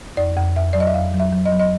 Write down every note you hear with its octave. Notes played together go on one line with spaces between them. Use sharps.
F2 D5
F2
F2 E5
F#3 D5
D#5
E5
F2 F5
F#3
E5
F#3
D#5
F#3
D#5